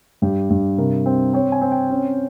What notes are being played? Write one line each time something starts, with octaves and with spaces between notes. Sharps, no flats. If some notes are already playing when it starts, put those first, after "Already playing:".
G2 G4
G2
C3 A#4
C4
C4 C#5
G#5
C4
G5
C#4